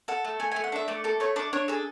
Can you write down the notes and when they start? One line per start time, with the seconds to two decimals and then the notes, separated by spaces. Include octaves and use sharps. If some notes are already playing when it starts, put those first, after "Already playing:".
0.08 A4 F#5
0.25 A3
0.40 A3 G#5
0.52 A3 G#5
0.64 F#5
0.72 D4 E5
0.88 A3 D5
1.04 A4 D5
1.20 A3 C#5
1.36 D4 D5
1.53 D4 C#5
1.68 G#4 A4